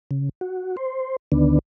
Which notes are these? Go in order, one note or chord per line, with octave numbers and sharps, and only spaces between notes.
C#3
F#4
C5
D2 D3 D#3 B3 D4